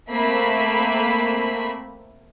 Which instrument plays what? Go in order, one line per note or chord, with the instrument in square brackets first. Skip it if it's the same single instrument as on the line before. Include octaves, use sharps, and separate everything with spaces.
[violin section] A3 A#3 C4 E5 B5 B6